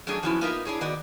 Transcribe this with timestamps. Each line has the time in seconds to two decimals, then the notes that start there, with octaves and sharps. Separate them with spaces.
0.07 F#3 A3 C#4 D4 G#4
0.23 F3 F#3 B3 C#4 D#4 E4
0.41 A#3 B3 D#4 F4 A#4 E5
0.65 D4 E4 G#4 C#5
0.81 D#3 B3 F#4 D5 D#5